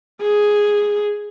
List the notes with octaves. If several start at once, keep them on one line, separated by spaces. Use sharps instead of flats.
G#4